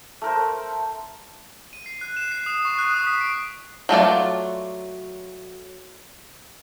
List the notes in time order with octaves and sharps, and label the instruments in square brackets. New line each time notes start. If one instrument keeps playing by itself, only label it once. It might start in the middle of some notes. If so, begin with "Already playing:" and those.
[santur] A3 A#4 C5
[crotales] D#7
C7
F#6
E7
C7
D#6
C#6
F#6
D#6
B6
D7
[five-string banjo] F#3 A3 F4 D5